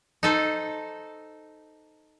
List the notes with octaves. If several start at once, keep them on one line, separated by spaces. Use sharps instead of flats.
D#4 A4 C5